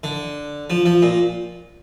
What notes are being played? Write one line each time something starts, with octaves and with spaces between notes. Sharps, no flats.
D3
F3
F3
A#2